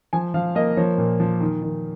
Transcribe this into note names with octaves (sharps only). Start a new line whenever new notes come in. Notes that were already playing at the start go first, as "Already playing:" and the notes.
F3 G#5
F3 F5
A#3 D#5
F3 C#5
A#2
F3
D#3
D#3